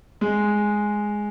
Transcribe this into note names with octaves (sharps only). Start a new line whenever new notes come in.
G#3